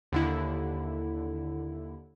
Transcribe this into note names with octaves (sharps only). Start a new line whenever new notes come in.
D#2 D3 E4